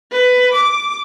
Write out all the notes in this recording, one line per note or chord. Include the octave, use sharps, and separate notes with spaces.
B4
D6